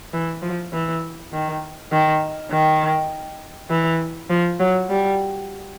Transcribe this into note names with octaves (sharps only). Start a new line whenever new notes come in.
E3
F3
E3
D#3
D#3
D#3
E3
F3
F#3
G3